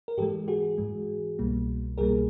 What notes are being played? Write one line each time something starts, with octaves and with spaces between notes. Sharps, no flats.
A#4
G#2 E3 G#3 G4 A4
F#4 G#4
G#2 E3 G#3
C2 B2 G3 A#3
C2 B2 G3 A#3 G#4 A#4